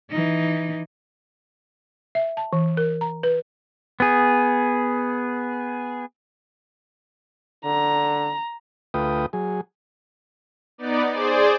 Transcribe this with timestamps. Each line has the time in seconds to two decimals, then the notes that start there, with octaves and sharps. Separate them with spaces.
0.11 E3 D#4
2.15 E5
2.37 A5
2.53 E3
2.77 A#4
3.01 A#5
3.23 B4
4.00 B3 G#4
7.65 D3 A#5
8.94 D2 A3 F4 B4 G5 D#6
9.33 F#3 G#4
10.78 B3 D#4 D5
11.11 G#4 C5 D5